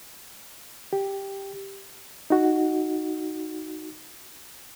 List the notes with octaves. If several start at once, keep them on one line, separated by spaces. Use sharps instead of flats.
G4
D#4 F#4